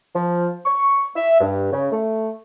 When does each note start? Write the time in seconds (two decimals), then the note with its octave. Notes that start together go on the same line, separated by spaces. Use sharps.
0.14 F3
0.65 C#6
1.16 E5
1.40 G2
1.72 C#3
1.92 A3